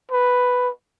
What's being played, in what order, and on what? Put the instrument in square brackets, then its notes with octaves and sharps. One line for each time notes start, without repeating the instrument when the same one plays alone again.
[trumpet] B4